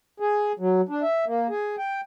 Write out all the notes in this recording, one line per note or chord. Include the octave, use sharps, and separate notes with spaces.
G#4
F#3
D4
E5
A#3
G#4
G5